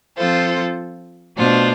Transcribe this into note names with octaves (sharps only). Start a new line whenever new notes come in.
F3 C4 F4 A4 C5
B2 A3 D4 F4 C5